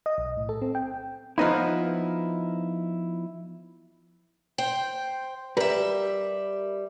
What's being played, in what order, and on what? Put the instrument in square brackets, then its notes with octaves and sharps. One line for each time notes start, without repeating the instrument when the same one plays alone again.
[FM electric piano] D#5
B1
A2
A4
C4
G5
[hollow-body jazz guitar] F3 B3 D#4 E4
[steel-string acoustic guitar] C5 G5
[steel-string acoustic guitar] G3 E5 [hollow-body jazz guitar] G4 A#4 B4